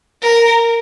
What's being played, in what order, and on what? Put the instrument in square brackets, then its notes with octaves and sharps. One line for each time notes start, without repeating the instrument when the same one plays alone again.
[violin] A#4